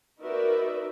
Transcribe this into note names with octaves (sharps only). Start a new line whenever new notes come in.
D#4 F#4 A#4 B4 D5 E5